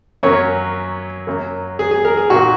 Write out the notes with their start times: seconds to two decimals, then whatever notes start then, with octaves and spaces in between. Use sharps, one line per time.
0.23 F#2 F#3 A#3 C#4 C#5
1.27 F#2 F#3 A#3
1.79 G#4
1.91 G#4
2.05 A#4
2.17 G#4
2.30 A#2 A#3 D#4 F#4